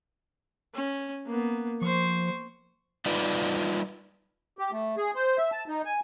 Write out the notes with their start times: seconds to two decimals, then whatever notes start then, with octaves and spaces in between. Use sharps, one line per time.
0.75 C#4
1.26 A#3 B3
1.82 F3 C5 C#6
3.06 G3 D#4 F4 B4 D5
4.59 G4
4.72 A3
4.97 G#4
5.15 C5
5.38 E5
5.52 A5
5.68 D#4
5.85 G#5